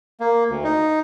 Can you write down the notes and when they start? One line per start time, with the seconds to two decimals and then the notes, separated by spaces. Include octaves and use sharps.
0.20 A#3
0.50 D2
0.64 D#4